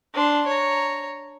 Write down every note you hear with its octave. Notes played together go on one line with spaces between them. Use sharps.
D4 C6
C#5 A#5